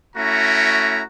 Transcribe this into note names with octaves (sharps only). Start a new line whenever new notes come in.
A3 C#4 E4 F#4 A#5